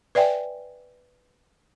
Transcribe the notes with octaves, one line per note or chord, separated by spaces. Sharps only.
B4 D5 E5 G5 G#5